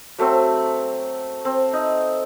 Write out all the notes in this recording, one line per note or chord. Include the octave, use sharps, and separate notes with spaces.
F#3 A3 C4
C4
D#4